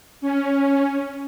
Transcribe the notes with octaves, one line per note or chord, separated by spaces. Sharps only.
C#4